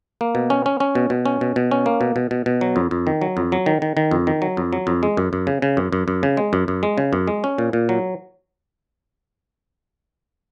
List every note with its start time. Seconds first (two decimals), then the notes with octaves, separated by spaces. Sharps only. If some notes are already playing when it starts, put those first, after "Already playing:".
0.21 A#3
0.35 B2
0.50 C#4
0.66 C#4
0.80 C#4
0.95 B2
1.10 B2
1.26 C#4
1.41 B2
1.56 B2
1.71 C#4
1.86 A#3
2.01 B2
2.16 B2
2.31 B2
2.46 B2
2.61 F#3
2.76 F2
2.91 F2
3.07 D#3
3.22 F#3
3.37 F2
3.52 F#3
3.66 D#3
3.82 D#3
3.97 D#3
4.11 F2
4.27 D#3
4.42 F#3
4.57 F2
4.73 F#3
4.87 F2
5.03 G#3
5.17 F#2
5.33 F#2
5.47 C#3
5.62 C#3
5.77 F#2
5.93 F#2
6.08 F#2
6.23 C#3
6.37 G#3
6.53 F#2
6.68 F#2
6.83 G#3
6.98 C#3
7.13 F#2
7.28 G#3
7.44 C#4
7.58 A#2
7.73 A#2
7.89 F#3